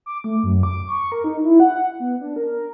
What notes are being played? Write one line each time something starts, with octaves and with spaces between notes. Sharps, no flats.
D6
A3
F#2
D6
C#6
A#4
D#4
E4
F#5
B3
D4
A#4